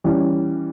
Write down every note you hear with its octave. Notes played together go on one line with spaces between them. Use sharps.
E3 G3 C#4